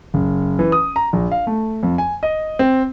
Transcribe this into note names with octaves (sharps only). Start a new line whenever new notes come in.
F#1
E3
D#6
A#5
A#1
F5
A3
F2
G#5
D#5
C4